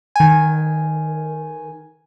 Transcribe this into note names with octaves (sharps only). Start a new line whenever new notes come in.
D#3 G#5